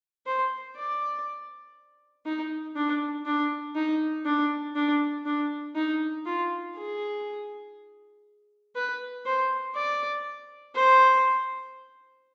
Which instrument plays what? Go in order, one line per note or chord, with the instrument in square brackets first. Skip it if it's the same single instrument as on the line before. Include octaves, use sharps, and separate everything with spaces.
[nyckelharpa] C5
D5
D#4
D4
D4
D#4
D4
D4
D4
D#4
F4
G#4
B4
C5
D5
C5